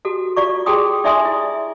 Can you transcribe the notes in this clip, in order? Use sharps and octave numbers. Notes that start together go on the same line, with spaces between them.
F#4 A4
F4 D5 C#6
G#4 A4 G5 C6 D#6
D#4 D5 E5 G#5 C6 D#6
E4